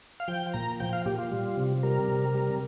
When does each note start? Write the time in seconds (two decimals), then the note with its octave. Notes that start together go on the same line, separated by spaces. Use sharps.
0.20 F5
0.28 F3 G5
0.54 A#2 A#5
0.80 F3 G5
0.93 F5
1.05 A#2 G4
1.18 F4
1.31 G3
1.57 C3
1.83 G3 A#4
2.08 C3
2.35 G3